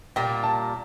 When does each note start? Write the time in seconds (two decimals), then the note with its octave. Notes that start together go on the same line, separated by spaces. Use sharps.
0.16 A#2 G3 A#3 G5
0.43 A5